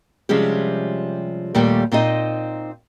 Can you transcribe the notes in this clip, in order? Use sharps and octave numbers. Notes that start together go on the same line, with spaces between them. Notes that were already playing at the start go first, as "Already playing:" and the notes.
C3 F3 G3 G#3 C#4 G4
D#2 A#2 G3 A3 G4
A#2 C4 D#4 D#5